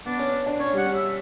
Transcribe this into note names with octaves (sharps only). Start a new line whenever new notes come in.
B3 D4
C#4
C#4
D4
C#4 C#5
G3 F#5
C#4
E5